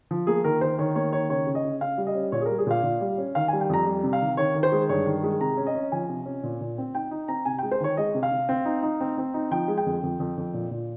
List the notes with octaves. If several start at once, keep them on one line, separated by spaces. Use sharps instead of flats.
F3
A#3 G#4
D#3 A#4
D#3 C5
D#3 C#5
A#3 C#5
D#3 C#5
C#3 C#5
C#3
D#5
C#3
C#3 F5
G3
D#5
C#4
A#2 C#5
G#4
G3 A#4
G#4
A#2 F5
A#2
G3
C#4
D#3 F5
G#5
G3
G5
F2 A#5
G3
C3
F5
D#3
D#3 C#5
D#3
C5
G#3
G2 C#5
D#3
G#3
C3 A#5
C#4
D#5
C#4
F3 G#5
C3
C#4
A#2
A#2
C4
D#4 G5
D#4
C4 A#5
C3 G#5
G5
G#3
C5
D#3 C#5
G#3 D#5
C3
F5
C3
C4
D#4
D#4
C4
C4
D#4
F3 G5
G#3
G5
F2
F2
F2
F2
A#2
A#2